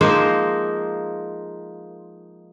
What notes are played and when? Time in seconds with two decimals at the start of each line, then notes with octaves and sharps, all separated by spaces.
0.01 F3 G#3 A#3 D#4 A#4 C5